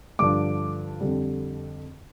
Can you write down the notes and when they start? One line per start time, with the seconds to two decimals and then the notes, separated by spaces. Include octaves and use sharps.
0.19 G2 D3 F3 D4 D6
1.00 F2 D3 G3